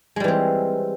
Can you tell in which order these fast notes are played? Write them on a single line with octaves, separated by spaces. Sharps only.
G#3 G3 E3 C4